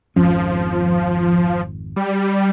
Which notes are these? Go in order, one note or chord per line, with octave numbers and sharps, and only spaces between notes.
G#1 F2 F3 C#4
G3